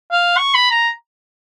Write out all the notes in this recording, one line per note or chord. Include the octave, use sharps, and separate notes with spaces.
F5
C#6
B5
A#5